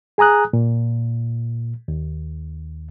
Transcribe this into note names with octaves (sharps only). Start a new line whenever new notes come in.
G#4 G#5 A#5 D#6 F#6
A#2
D#2